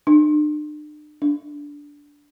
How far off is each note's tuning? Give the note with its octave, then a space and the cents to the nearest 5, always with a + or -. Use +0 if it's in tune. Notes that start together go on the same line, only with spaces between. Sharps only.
D4 +40
D4 -10